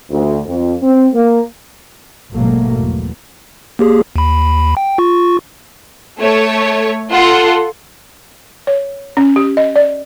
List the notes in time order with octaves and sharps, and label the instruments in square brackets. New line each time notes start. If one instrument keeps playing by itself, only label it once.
[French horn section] D2
F2
C4
A#3
[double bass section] G#1 G#2 B2 F#3 A3 A#3
E2
[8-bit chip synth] A#3 G4 G#4
D#2 B5
G5
F4 C#6
[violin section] A3 C#5
F4 A4 F#5 C6
[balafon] C#5
C#4
G4
D#5
D5